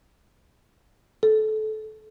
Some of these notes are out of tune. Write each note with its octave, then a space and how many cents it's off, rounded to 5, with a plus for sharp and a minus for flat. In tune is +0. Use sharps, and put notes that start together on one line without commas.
A4 -25